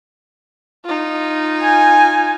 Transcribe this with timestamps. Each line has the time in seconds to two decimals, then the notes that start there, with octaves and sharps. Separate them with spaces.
0.85 D#4 F4
1.61 G#5